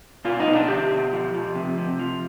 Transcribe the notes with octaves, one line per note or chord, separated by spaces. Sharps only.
B2 F4
D#4
B2
D4
B2 G4
B2
F3
F3
C3
C3
F3